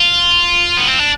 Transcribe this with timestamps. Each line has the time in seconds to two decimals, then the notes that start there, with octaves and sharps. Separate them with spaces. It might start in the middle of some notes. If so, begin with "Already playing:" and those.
Already playing: F4
0.77 B3
0.88 C4
0.99 D4